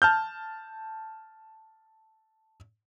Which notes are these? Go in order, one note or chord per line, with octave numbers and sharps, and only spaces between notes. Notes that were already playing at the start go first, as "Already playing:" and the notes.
A5 F6 G6